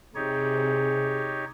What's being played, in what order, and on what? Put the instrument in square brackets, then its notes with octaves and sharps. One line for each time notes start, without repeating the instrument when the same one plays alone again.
[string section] C3 [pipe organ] D#4 G4 C#5 [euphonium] G#4